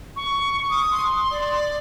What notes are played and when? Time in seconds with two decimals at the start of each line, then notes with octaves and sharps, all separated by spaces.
0.16 C#6
0.70 D#6
0.91 C6
1.31 D5